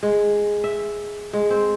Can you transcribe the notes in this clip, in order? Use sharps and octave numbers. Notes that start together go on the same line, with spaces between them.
G#3
E5
G#3
C4